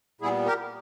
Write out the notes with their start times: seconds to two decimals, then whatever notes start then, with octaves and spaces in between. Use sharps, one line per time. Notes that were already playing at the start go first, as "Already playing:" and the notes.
0.21 A#2 G3 B3 E4 G#4
0.46 G4 A#4